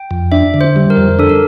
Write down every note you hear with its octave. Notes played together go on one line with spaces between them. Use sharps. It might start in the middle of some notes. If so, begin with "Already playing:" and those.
Already playing: G5
F2
D4 E5
D3
C5
G3
A#4
F2
D4 A4
A#4